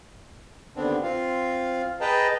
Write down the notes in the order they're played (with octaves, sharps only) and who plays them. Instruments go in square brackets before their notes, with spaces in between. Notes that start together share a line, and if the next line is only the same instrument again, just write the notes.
[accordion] D#2 D3 B3 C4 D4
C4 F4 F5
G#4 B4 D#5 G5 A5 A#5